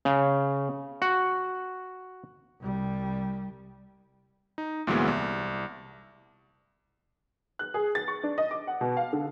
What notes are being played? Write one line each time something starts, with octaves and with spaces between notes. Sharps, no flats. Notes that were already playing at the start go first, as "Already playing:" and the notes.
C#3
F#4
C2 G3
D#4
D2 A#2 E3 F#3 G#3 B3
C2
F#6
G#4
A6
C#6
D4
D#5
D6
F#5
B2
F5
D3